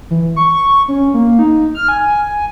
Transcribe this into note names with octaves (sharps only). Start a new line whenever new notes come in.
E3
C#6
C#4
A#3
D#4
F6
G#5